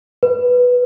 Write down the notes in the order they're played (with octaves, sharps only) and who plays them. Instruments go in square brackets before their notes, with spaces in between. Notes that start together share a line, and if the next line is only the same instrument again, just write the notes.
[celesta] B4